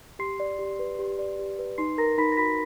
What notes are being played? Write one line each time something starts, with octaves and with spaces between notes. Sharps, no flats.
G4 C6 C7
D5
G4
B4
G4
D5
G4
B4
D#4 C6 C7
A#4 A#5 A#6
D#4 B5 B6
A#6
F#4 B5 B6